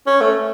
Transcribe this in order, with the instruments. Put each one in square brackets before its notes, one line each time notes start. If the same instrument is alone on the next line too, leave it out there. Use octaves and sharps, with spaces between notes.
[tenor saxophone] C#4
A3